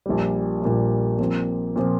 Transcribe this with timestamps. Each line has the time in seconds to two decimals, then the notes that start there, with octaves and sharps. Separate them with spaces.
0.06 A#1 A#2 G3
0.62 A#1 A#2 G3
1.19 A#2 F3 C4
1.76 A#2 F3 C4